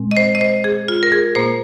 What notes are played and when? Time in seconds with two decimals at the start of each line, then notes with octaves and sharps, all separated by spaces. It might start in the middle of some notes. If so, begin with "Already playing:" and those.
Already playing: A#2 G#3 C4
0.11 D#5
0.17 C5
0.35 D#5
0.41 C5
0.64 G#4
0.88 F4
1.03 A#4
1.12 G#4
1.35 A#2 A#3 C5